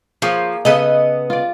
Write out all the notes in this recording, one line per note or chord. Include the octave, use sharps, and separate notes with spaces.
F3 A#3 G#4 C#5
C#3 B3 A4 B4 D#5
F4 D5